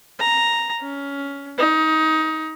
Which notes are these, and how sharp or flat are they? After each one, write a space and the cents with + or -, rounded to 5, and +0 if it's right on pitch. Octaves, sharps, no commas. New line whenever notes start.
A#5 +0
C#4 +15
D#4 +20